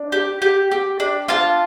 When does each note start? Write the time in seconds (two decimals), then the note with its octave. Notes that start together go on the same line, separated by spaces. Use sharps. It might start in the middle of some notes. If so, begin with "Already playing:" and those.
Already playing: D4
0.12 G4
0.42 G4
0.71 G4
1.00 D4
1.28 F4 F5 A5